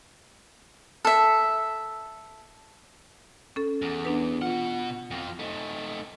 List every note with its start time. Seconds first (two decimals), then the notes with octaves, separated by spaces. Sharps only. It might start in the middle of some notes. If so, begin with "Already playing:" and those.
1.05 A4 E5
3.56 C#4 A4
3.82 E2
4.05 B3 D4 B4
4.42 B2 F4 F#5
5.11 F2 F3
5.40 A3 D#4